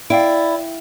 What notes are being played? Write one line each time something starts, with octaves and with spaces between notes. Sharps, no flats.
E4 D5 F5 G5 D7